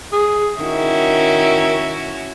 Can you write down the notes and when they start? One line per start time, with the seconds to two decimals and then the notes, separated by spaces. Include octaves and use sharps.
0.12 G#4
0.59 D#3 C#4 E4 F#4